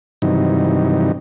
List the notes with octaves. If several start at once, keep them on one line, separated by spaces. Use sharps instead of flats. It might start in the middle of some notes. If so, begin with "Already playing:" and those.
G2 C3 D#3 E3 F#3 D#4